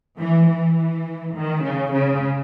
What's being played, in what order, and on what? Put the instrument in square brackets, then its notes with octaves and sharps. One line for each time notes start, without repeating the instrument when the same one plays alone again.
[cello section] E3
E3
D#3
C#3
C#3